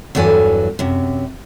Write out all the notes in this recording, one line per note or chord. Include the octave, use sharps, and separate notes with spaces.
E2 G2 F#3 A4 B4 G#5
F#2 C3